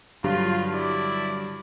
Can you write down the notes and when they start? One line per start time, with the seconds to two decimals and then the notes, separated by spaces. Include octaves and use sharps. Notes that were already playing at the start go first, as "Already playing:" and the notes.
0.24 G2 D3 F#3 F4
0.73 E4 D5